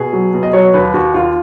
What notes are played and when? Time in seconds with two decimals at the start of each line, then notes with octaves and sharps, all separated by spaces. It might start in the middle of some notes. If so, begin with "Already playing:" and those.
Already playing: B2 G#4
0.13 F#3
0.34 B2
0.43 D#5
0.53 F#3 C#5
0.74 D#2 B4
0.94 D#2 F#4
1.14 D#2 F4